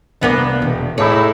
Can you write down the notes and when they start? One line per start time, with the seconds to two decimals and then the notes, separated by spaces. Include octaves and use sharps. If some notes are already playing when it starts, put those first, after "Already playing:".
0.21 C2 A#3 B3 D4 D5 D6
0.62 E1 C3
0.98 A2 D#4 E4 G#4 A4 C#5 D6